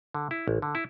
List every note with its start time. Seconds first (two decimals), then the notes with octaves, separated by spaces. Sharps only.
0.14 D3
0.31 E4
0.48 A1
0.62 D3
0.75 E4